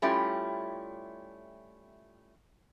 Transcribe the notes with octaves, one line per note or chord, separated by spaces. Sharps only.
G3 A3 C#4 E4 F4 G4